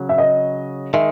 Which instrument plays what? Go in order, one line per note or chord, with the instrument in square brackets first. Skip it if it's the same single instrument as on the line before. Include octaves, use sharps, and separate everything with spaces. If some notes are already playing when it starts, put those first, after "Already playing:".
Already playing: [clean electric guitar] C#3 F#3
[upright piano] E5
D#5
[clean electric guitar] D#3 G#3 [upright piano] E5